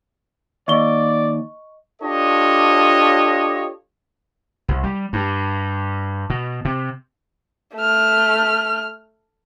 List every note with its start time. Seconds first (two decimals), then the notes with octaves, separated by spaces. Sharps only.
0.68 D#2 D5 D#5 C#6 G7
2.02 D4 F4 G4 A4 C#5 D#5
4.68 C2
4.84 G3
5.13 G2
6.30 B2
6.65 C3
7.76 A3 F6